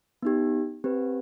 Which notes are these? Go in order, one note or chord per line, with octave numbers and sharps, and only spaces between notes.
B3 D#4 G4
C4 G4 B4